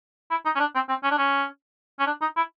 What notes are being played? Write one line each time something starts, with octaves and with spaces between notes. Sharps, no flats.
E4
D#4
C#4
D4
C4
C4
C#4
D4
C#4
C#4
D4
D#4
E4